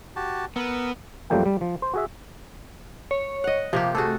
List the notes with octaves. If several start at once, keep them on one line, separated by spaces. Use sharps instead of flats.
F#4 G4 A5
B3 A#4 E6
F#2 F3 G3 A3 A#3 G5
G3
F3
C5
F#4 G#4 E5
C#5
D#5 F#5
C3 F3 A#3 G4
A3 F#4 G#4 A4